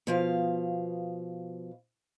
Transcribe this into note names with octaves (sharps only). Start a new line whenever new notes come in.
B2 F3 F5